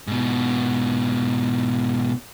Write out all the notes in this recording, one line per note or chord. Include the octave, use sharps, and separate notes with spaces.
G#2 B2